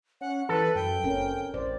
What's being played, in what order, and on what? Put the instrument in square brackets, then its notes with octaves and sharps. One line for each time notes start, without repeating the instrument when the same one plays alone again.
[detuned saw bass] C#4 [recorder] F#5
[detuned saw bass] E3 [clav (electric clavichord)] A4 [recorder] B4
[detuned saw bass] F#2 [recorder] G5
[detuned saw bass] F#1 [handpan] C4 C#4 A#4
[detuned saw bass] A1 [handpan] C5 D5